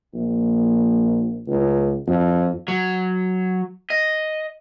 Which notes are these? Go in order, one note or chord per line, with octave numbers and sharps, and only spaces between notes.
A#1
C#2
F2
F#3
D#5